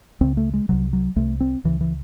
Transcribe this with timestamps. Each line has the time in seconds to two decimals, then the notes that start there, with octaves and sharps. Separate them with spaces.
0.21 C#2 C#3 C4
0.37 A3
0.53 G#3
0.69 C2 C3 F#3
0.93 F#3
1.16 C2 C3 A3
1.40 C4
1.64 C#2 C#3 E3
1.81 E3